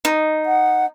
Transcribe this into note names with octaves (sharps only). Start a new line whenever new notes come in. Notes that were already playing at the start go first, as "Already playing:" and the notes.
D#4
F#5